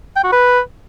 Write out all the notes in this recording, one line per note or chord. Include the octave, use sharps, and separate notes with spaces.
G5
F#4
B4